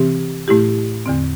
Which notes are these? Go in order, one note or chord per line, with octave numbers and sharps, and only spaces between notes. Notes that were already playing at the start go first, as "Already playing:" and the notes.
Already playing: C3 E3 C4 G4
A2 A3 E4 G4
E2 D3 C4